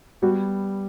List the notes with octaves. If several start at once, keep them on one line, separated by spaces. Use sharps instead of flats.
G3 B3 F#4